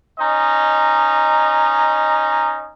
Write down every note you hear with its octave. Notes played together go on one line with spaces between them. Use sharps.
C#4 D#4 D#5 A#5